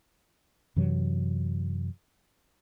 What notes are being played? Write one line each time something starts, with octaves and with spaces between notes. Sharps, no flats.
F#2 C3 E3 F#3